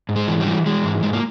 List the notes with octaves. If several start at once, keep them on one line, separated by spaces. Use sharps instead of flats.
G#2
G#3
E3
G3
E3
E3 G#3
G#2
G#2 G#3
A#3